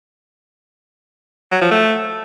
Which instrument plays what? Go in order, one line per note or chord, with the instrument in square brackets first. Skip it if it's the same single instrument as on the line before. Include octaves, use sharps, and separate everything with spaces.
[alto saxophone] F#3
F3
A3